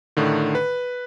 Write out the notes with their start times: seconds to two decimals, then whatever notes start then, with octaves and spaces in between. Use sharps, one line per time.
0.17 A2 D3 D#3
0.55 B4